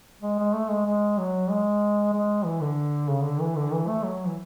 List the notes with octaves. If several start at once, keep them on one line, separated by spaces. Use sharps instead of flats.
G#3
G#3
A3
G#3
G#3
F#3
G#3
G#3
E3
D3
C#3
D3
E3
D3
E3
A3
F#3
E3